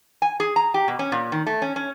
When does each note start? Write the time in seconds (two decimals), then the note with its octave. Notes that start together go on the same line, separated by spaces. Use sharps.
0.22 G#5
0.40 G#4
0.56 A#5
0.74 G4
0.88 B2
0.99 C#4
1.12 A#2
1.32 D#3
1.47 A3
1.62 C#4
1.76 C#4